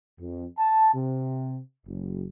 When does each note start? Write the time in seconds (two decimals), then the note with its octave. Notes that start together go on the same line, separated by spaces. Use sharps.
0.19 F2
0.58 A5
0.94 C3
1.86 F#1